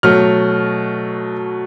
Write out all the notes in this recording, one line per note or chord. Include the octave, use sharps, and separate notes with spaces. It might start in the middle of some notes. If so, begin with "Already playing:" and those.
B2 F#3 A3 F6